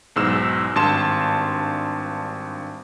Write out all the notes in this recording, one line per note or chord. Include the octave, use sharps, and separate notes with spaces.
B1 E2 G#2 E6 F6 E7
G#1 G2 A5 C6 E7